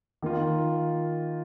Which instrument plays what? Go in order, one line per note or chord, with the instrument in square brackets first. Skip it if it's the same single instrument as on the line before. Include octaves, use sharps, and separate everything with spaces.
[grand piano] D#3 A#3 F4